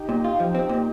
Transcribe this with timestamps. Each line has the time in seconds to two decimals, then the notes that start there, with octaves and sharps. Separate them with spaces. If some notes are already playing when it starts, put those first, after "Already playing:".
Already playing: D#4 G4
0.09 A#2
0.24 F4
0.40 F3
0.55 C4
0.69 A#2